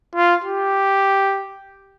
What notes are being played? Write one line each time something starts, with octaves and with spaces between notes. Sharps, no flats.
F4
G4